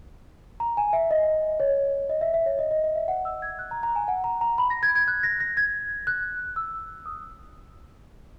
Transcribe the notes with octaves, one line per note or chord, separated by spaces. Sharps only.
A#5
G#5
E5
D#5
C#5
D#5
E5
E5
C#5
D#5
D#5
D#5
E5
F#5
E6
G#6
F#6
A#5
A#5
G#5
F#5
A#5
A#5
B5
A#6
G#6
G#6
F#6
A#6
A#6
G#6
F#6
E6
D#6